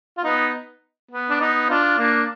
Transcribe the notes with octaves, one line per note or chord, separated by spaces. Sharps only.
F4
B3 D#4
B3
D4
B3 D#4
D4 F4
A#3 D4